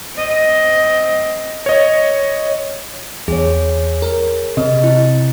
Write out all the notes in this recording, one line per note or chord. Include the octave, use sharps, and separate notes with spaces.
C4 D#5
C#5 D#5
E2 G#4 C#5
A#4
C3 D#5
E4